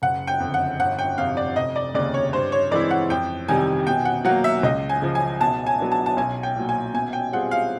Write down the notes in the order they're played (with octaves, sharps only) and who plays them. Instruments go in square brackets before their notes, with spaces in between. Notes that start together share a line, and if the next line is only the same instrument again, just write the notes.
[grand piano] F#1 [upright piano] F#5
[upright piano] G5
[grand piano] F2 D3
[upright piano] F#5
[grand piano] G1 [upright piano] F#5
[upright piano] G5
[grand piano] F2 C3 [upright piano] F5
[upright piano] D5
[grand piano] F1 [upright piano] D#5
[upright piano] D5
[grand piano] D#2 C#3 [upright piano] D5
[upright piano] C#5
[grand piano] G2 [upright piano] C5
[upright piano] C#5
[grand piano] E3 G#3 C4 E4 [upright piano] D5
[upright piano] F#5
[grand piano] F2 [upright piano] G5
[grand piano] C3 D#3 G3 [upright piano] G#5
[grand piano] B2 [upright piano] G5
[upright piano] F#5
[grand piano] F#3 A#3 [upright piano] F#5
[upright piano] E5
[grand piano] C#2 [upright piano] D#5
[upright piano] G#5
[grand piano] C#3 F3
[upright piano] G#5
[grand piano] B2 [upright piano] A5
[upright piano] G#5
[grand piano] F#3 B3 D4
[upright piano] A5
A5
[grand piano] B1 [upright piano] G#5
[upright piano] G5
[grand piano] A#2 F#3
[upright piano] G#5
[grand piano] B2 [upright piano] G#5
[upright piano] G5
[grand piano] G3 C4 F4 G#4 [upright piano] F#5
[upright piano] F5